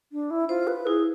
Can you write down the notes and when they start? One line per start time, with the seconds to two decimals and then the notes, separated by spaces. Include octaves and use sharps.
0.12 D4
0.31 E4
0.49 F4 C5
0.67 B4
0.86 E4 G#4